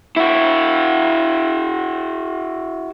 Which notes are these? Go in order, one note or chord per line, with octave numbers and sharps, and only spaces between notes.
E4 F#4